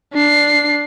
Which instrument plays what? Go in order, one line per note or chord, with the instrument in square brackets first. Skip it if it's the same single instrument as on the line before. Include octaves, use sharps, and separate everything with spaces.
[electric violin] D4 C7